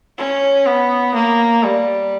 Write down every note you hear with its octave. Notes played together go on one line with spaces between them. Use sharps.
C#4
B3
A#3
G3